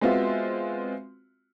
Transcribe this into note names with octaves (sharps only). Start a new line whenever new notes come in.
G#3 B3 C4 F4 F#4 E5